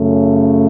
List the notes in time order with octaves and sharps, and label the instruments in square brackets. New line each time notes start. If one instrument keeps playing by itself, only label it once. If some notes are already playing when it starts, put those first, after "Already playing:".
Already playing: [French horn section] F#2 C#3 A3